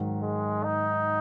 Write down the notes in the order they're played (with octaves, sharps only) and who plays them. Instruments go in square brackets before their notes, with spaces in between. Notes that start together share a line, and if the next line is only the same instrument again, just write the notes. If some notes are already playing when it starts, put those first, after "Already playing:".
Already playing: [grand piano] G#2 D#3 F#3
[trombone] G#3
D#4